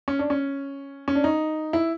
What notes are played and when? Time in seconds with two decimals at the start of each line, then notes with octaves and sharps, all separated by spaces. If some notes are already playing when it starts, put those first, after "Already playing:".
0.08 C#4
0.19 D4
0.30 C#4
1.08 C#4
1.15 D4
1.24 D#4
1.73 E4